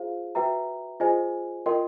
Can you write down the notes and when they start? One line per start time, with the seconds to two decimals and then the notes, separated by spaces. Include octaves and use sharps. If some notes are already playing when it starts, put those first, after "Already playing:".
Already playing: F4 G#4 C5 F5
0.35 F#4 B4 E5 G5 A#5
1.00 F4 G#4 C5 D#5 G#5
1.66 F4 A#4 D#5 G5 C6